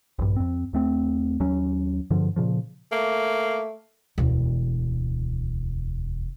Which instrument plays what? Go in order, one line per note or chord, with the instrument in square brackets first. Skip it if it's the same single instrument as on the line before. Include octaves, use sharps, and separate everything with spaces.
[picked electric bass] A#1 G2
F2 C4
D#2 A3 C4
D#2 F#3 C#4
G2 D3 F3
A#2 C#3 F3
[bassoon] A3 [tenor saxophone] A#3
[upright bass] E1 D2